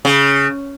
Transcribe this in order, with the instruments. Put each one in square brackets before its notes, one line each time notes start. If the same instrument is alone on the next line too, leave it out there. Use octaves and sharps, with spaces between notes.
[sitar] C#3